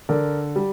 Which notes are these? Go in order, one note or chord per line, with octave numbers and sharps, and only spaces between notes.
D3 A#4 D5
G3